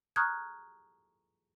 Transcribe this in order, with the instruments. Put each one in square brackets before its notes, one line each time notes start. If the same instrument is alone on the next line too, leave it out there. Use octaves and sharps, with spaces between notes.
[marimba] A#5 C#6 D#6 F6 F#6 G#6